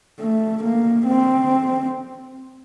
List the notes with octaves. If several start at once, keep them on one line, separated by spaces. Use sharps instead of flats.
A3
A#3
C4